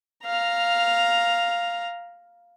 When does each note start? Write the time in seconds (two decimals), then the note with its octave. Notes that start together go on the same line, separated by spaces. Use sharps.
0.25 F5 A#5